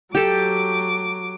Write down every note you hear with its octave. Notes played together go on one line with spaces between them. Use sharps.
F#3 G4 A4 D6